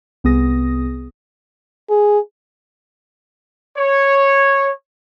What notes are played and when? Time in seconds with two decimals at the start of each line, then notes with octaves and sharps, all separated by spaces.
0.24 C2 B3 G#4 D#6 A#6
1.90 G#4
3.78 C#5